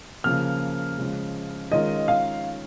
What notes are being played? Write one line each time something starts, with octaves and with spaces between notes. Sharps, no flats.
C#3 F3 A#3 F6
C#3 F3 G#3
D#3 G#3 C#4 F4 A#4 D#5
F5